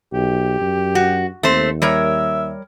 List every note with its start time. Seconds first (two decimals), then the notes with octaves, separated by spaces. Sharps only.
0.13 B1 G4
0.61 F#2
0.95 F#4
1.43 D#2 A3 C4 C5
1.82 G3 A#4 C#5 E5